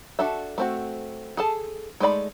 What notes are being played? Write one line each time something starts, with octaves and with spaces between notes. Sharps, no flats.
D4 F#4 A4 E5
A3 C4 F#4
G#4 A4 A5
G#3 A3 D#4 D5 B5